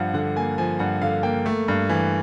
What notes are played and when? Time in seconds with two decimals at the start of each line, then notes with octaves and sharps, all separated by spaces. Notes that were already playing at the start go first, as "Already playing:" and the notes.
Already playing: G2 F3 F5 F#5
0.14 D3 F#5
0.36 A#3 G#5
0.58 F3 G#5
0.79 G2 F#5
1.02 D3 F5
1.23 A#3 G5
1.46 A3
1.68 G2
1.89 E3